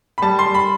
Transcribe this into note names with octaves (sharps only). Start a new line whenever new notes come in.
B5
G3 A5
C6
G3
B5